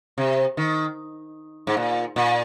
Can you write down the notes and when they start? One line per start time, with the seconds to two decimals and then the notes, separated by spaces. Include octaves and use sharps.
0.18 C3
0.57 D#3
1.67 G#2
1.77 A#2
2.16 A#2